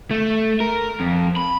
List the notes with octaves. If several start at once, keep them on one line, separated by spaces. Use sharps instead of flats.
A3
A#4
F2
B5